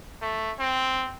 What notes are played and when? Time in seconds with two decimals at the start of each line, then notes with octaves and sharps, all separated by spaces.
0.22 A3
0.59 C4